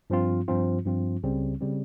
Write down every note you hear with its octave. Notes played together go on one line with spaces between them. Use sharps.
G2 F3 C4 F4
G2 F3 C4 F4
G2 F3 C4 F4
C#2 C#3 G3 C4
C#3 G3 C4